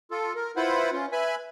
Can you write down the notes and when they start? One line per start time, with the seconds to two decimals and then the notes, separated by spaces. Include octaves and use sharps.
0.11 F4 A4
0.36 A#4
0.56 E4 F4 B4 C5 F#5 B5
0.92 C#4 F4
1.12 B4 E5 G#5 B5